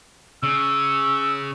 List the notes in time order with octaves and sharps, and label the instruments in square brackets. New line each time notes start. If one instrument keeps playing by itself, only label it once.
[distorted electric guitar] C#3 [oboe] E6